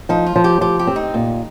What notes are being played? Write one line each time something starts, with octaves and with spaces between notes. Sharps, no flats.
F3 D#4
F4
F3
G4
F3 G4
G4
C4
D#4
A#2